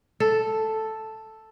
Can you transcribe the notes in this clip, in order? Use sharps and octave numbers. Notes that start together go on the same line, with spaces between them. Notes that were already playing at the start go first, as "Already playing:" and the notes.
A4